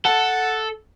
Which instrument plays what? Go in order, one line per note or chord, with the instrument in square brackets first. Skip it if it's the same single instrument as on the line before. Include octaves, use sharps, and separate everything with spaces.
[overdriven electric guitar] A4 [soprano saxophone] F#5